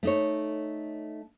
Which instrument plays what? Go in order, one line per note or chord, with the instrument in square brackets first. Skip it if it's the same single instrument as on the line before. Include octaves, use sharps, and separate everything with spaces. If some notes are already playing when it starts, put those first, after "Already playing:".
[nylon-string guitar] A3 D#4 C#5